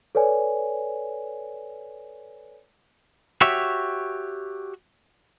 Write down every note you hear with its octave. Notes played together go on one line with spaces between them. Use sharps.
A4 B4 C#5 D5 G#5
F#4 G4 C#5 E5